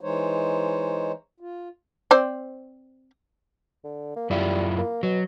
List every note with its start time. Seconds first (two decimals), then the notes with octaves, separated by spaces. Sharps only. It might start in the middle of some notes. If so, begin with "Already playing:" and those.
0.01 E3 G#3 D#4 C5 C#5
1.40 F4
2.11 C4 C5 D5
3.84 D3
4.16 A#3
4.30 F#2 G3 E4 F4
4.78 A#3
5.03 B2 F#3